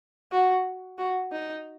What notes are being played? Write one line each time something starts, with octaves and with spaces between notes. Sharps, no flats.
F#4
F#4
D#4